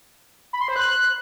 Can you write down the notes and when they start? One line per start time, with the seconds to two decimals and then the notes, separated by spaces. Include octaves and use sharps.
0.53 B5
0.61 C6
0.68 C5
0.76 F#6